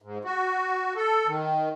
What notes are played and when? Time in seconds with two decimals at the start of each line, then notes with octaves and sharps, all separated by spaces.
0.02 G#2
0.25 F#4
0.96 A4
1.27 D#3